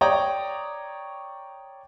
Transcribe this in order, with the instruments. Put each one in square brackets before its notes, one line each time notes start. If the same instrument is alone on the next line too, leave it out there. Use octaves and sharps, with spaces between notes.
[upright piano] C#5 D5 G5 A#5 D#6